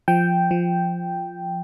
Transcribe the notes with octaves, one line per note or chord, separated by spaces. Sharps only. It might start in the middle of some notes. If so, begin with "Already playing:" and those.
F3 G5
F3